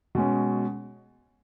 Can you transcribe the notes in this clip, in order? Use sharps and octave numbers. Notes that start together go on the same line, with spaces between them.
B2 G#3 C#4